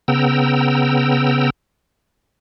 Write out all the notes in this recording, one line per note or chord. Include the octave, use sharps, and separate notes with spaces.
C#3 B3 G5 A#5 E6